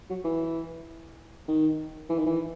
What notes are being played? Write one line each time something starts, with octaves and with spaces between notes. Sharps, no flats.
F#3
E3
D#3
E3
D#3
E3